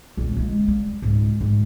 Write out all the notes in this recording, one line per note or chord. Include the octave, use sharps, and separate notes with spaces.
D#1 C4
G#3 A#3
G3
C#2 G#2
G#2